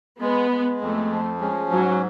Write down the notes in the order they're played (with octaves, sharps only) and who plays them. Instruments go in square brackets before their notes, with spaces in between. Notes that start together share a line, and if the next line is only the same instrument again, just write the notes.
[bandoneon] G#3 [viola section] B3
[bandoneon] G#3
[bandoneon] F2 [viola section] A3
[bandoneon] F3
[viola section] G#3 [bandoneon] C#4
[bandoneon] G#2 [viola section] F#3